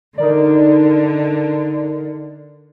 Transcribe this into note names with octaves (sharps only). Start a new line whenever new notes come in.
D3 D#4 A#4 D5